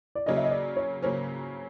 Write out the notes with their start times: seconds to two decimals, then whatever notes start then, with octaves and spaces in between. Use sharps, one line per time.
0.15 D5
0.26 C#3 F#3 A#3 C#4 D#5
0.37 E5
0.44 D#5
0.51 D5
0.77 C#5
1.02 C#3 F#3 A#3 C#4 C5